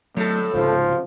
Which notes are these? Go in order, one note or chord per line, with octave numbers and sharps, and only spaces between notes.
A2 F#3 A3 A4
C2 G#2 C#3 F3